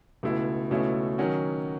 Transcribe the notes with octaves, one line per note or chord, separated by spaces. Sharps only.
C#2 B2 A3 E4
C#2 B2 A3 C#4 E4
D#3 F#3 C#4 F#4